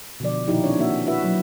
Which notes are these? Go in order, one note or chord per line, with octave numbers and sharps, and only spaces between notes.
B2 D3 F3 D5
A#2 D#3 F3 D#4 E4 G4
C4 D4 C#5
A#3 F#4 E5
E4 F#4 B4 E5
F#3 F#4